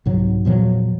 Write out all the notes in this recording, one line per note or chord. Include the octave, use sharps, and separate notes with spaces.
C2 G#2 F#3
E2 A#2 F3 F#3